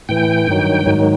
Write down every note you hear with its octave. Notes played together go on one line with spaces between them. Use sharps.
A2 E3 G5
G2 D#3 F#3
G#2 D#3 F#3